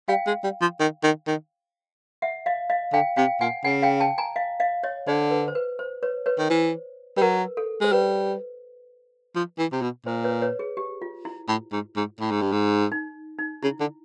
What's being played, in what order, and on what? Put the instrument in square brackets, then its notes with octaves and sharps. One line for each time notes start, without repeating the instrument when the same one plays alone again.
[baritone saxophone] G3 [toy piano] F5 G5
[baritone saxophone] G#3
G3
F3
D#3
D#3
D#3
[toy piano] E5 F#5
D#5 F5
D#5 F5
[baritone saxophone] D3 [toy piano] F5 G5
[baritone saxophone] C3 [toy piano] F5 G5
[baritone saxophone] A#2 [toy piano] F#5 G#5
[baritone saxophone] C#3 [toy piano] F#5 G#5
[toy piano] F5 G5
G5 A5
G#5 A#5
D#5 F5
D#5 F5
C#5 D#5
[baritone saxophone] D3 [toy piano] C5 D5
[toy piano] B4
C5
B4
C5
B4 C#5
B4 C#5
[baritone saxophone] D#3
[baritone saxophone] E3 [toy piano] C5
[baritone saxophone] G3 [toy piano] B4
[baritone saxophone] F#3 [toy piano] A#4
[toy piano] A4
[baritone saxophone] G#3 [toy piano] C5
[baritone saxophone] G3 [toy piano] B4
[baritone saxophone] F3
E3
C3
B2
[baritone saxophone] A#2 [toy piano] C5
[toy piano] B4 C#5
B4 C#5
G#4
G4
F4
E4
[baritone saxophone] A2
G#2
G#2
A2
G#2
G2
G#2
[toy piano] D#4
D#4
[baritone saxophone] C#3 [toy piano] E4
[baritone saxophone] D3